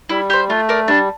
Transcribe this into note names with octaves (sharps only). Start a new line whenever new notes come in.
G3 E4
G4 C5
A3 F4
A#4 D5
G3 D4